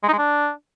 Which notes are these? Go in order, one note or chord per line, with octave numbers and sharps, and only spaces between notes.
G#3
D#4
G#3
D4